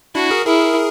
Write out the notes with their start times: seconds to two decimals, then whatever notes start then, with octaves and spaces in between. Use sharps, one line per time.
0.15 D4 E4 F#4
0.31 G#4 A#4
0.46 E4 G#4 A#4